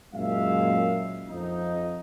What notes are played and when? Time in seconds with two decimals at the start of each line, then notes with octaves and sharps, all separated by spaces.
0.14 F#2 A#2 G#3 E5 F5
1.29 F2 D#4